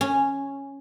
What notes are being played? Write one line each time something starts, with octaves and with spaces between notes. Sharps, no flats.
C#4